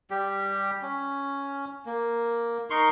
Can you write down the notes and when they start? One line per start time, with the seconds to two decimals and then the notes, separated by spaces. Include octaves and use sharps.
0.11 G3 G4
0.82 C#4
1.86 A#3
2.70 D#4 A#4 C6 C#6